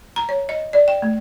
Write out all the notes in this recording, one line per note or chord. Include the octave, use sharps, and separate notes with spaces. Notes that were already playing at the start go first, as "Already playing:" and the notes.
A#5
C#5
D#5
D5
G5
A3